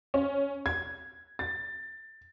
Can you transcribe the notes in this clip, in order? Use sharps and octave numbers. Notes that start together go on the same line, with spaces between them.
C#4
G#6
A6